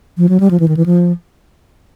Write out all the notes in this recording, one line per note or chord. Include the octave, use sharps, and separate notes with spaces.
F3
F#3
G3
F3
E3
D#3
E3
F3